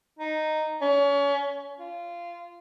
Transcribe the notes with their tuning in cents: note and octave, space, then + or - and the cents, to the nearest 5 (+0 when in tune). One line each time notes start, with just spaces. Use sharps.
D#4 -5
C#4 +30
F4 -15